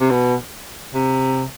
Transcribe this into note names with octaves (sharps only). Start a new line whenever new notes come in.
C3
B2
C3